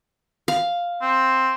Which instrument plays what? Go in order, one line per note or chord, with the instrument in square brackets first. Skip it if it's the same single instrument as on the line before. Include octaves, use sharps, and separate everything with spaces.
[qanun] F5
[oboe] C4